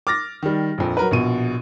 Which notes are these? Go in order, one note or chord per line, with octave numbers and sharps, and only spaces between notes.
D6 F6 A6 A#6
D#3 G3
A#1 F2
F#3 A#4 B4
A#1 B2 D#7